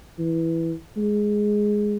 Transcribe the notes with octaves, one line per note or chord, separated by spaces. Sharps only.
E3
G#3